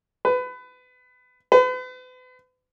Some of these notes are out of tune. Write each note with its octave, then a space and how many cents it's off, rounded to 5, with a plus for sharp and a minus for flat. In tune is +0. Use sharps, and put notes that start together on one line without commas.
B4 +25
B4 +40